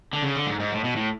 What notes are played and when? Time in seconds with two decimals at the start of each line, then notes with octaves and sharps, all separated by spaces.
0.13 D3
0.22 C#3
0.35 D3
0.47 G#2
0.60 G#2
0.72 A2
0.84 B2
0.96 A2